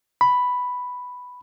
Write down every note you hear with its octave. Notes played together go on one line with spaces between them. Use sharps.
B5